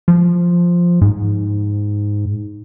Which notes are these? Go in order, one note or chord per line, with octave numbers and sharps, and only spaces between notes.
F3
G#2